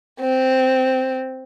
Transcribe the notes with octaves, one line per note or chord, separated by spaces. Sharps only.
C4